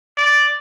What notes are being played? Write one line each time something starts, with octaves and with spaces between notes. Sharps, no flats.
D5